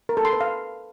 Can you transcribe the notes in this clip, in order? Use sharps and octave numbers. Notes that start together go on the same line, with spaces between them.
A#4
A4
C6
B4
F5